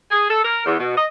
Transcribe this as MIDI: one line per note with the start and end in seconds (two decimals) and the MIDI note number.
0.12 0.25 68
0.29 0.41 69
0.44 0.66 70
0.66 0.76 40
0.79 0.94 47
0.97 1.05 75